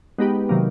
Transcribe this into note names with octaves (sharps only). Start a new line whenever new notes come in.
G#3 B3 D#4 G4 B4
C3 D#3 F#3 A#3